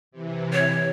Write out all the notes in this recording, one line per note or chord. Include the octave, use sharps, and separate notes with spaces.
C3 E3
C#5